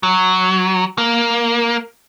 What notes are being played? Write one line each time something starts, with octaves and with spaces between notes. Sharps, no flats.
F#3
A#3